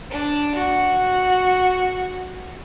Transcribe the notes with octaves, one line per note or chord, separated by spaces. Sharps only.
D4
F#4